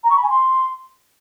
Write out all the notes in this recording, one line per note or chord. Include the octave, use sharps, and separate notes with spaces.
A#5
C#6
B5
G#5
C6